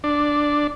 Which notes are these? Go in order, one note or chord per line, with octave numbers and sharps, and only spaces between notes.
D4